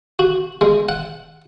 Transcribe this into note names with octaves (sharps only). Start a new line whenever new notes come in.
F#4
G#3
F#5